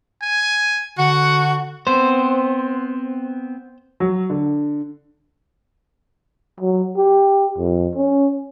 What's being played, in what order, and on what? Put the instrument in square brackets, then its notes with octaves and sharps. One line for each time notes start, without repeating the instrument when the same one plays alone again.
[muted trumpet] G#5
[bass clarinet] D3 [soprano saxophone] F#4 [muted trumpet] F#5
[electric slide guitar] B3 C4 [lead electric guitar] C5
[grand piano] F#3
D3
[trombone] F#3
G4
F2
C#4